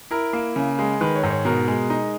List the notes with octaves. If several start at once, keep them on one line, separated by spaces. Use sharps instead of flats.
E4 A#4
A#3
C#3
G#3
D#3 B4
C#5
G#2
C#5
B2 A#4
G#3
D#4